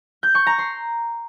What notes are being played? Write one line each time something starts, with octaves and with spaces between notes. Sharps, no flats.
G6
C#6
A#5
C6